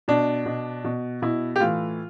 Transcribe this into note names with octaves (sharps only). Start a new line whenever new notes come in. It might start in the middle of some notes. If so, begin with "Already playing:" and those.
B2 D4
B2
B2
B2 E4
G4
A2 E3 F4